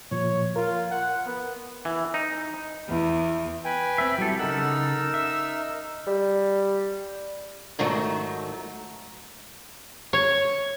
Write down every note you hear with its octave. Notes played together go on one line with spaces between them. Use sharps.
A#2 F3 C#5
F4 A#4
F#5
B3
E3
D#4
E2
B4 G5 G#5
C4 E5
F#3 G3 E4 A4
C#3 D#4 A4 A#4 F#5 E6
E5
G3
G#2 D#3 F#3 A3
C#5